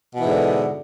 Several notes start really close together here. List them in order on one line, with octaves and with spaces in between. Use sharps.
B2 E3 G#2 D3